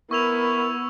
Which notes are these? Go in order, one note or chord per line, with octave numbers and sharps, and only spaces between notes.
B3 E4 A#4 C#6 E6 F7